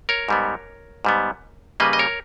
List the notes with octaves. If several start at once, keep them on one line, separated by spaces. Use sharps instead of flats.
A#4 C#5
G#2 G3 B3
G#2 G3 B3
C#3 G3 A#3 B4 D#5
D#5
A#4 C#5